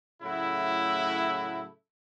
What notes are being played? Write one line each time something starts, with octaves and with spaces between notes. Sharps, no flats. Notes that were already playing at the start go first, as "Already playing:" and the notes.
A2 C#3 F#3 A3 E4